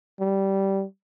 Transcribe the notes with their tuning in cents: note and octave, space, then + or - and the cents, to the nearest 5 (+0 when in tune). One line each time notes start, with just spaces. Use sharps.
G3 -10